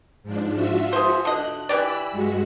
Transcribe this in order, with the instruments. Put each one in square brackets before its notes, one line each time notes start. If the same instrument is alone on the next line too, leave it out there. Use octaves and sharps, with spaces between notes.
[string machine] G#2 F3 D4
F4 F#4 E5
[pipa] G#4 C5
[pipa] D3 D#5 [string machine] F#6
[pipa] E3 G4 D5 [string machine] B5 E6
[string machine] G2 G#3 F#4